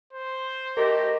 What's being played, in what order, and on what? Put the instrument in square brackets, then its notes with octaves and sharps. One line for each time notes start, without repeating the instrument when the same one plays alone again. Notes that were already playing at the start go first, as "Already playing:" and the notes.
[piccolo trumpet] C5
[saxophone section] A3 G4 [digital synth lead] A#4 [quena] D#5